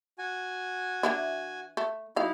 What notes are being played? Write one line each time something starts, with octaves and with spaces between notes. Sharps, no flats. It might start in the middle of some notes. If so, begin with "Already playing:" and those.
F#4 G#5
E3 D4 E4
A3
F#3 D#4 E4 F5